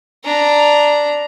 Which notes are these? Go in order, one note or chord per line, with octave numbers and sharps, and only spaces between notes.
D4 A#5